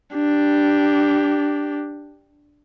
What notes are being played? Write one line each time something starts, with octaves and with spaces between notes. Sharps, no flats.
D4 G4